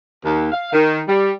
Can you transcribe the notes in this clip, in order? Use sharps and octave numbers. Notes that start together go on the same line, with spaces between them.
D#2
F5
D#3
G3